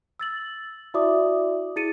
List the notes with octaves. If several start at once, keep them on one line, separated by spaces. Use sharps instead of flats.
E6 A6 F#7
E4 F#4 D5 E5 D6 D#6
E4 G#4 A6 C#7 D#7